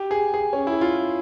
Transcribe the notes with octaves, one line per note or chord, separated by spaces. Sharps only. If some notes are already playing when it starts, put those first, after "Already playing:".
Already playing: G4
G#4
G#4
C#4
E4
F4